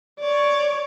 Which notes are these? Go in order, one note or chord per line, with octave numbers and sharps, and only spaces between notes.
C#5 D5